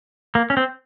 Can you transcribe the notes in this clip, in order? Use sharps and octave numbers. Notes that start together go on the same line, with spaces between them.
A#3
C#4
C4